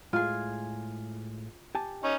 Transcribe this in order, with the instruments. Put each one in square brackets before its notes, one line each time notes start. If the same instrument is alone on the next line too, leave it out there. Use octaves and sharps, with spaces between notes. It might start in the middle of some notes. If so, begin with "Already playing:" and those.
[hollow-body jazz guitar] A2 G#3 [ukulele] F4 G#4
[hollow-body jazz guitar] G4 G#5 A5
[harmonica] C#4 D#4